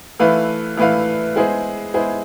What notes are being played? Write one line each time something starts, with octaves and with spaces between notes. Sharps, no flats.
E3 A3 E4 B4 F5
E3 A3 E4 B4 F5
G#3 B3 E4 G#4 C5
G#3 B3 E4 G#4 C5